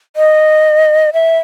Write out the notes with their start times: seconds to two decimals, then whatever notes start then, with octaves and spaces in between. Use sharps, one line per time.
0.16 D#5
1.13 E5